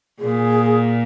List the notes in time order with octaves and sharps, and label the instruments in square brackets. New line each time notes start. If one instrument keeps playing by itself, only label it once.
[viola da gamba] A#2 [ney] G#4